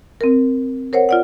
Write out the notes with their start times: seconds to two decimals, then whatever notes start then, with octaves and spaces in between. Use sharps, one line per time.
0.21 C4 A#4
0.93 A#4 C5 C#5 F#5
1.09 F4 D5 F#5